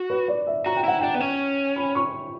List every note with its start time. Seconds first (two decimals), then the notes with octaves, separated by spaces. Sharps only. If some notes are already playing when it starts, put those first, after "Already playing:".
Already playing: F#4
0.10 B4
0.28 D5
0.47 E5
0.66 F#4 A#5
0.76 G5
0.84 E4 F#5
1.01 D4 G5
1.14 B3
1.20 C#4
1.76 B5
1.95 C#6